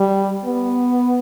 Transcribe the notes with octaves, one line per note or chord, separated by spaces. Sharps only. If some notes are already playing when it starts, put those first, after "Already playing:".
Already playing: G3
B3